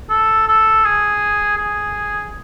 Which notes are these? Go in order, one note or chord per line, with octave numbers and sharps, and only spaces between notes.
A4
A4
G#4
G#4